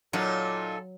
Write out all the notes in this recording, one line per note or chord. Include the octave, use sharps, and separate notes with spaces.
A#2 F#3 D#4 F4 A4